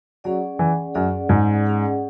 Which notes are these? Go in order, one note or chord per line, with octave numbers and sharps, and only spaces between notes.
F#3 C#4 G#4 D5 F#5
E3
F#2 C#4 G#4 D5 F#5
G#2
C#4 G#4 D5 F#5